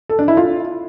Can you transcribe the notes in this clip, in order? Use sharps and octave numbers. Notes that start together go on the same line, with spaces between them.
A4
D4
E4
F4